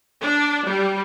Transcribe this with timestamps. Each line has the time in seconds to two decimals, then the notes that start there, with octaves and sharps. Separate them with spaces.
0.21 D4
0.66 G3